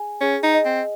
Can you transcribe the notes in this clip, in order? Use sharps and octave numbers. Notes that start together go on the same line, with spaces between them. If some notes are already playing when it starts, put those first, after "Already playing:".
Already playing: G#4 G#5
C#4 G#4
D#4
D#5
C4